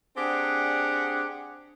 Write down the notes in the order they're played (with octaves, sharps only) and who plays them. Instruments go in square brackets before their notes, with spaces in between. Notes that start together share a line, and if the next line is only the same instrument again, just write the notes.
[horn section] C4 D4 G4 G#4 F#5